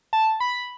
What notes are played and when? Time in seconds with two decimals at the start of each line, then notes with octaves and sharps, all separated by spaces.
0.13 A5
0.40 B5